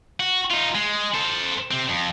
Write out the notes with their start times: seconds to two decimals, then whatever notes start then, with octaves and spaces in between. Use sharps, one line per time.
0.20 F#4
0.50 D#4 F4
0.75 G#3
1.15 A4 C5
1.71 C3 C4
1.89 F2